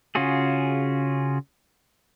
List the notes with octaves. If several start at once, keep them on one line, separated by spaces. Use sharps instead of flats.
C#3 C#4 F4 F#4 G#4